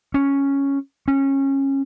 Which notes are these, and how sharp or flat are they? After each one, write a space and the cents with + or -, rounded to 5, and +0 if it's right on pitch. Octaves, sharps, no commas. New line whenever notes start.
C#4 +0
C#4 -20